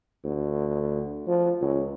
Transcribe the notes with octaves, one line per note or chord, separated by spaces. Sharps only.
D2
F3
C#2